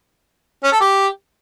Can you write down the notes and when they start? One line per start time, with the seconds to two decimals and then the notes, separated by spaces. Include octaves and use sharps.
0.64 C#4
0.72 A4
0.81 G4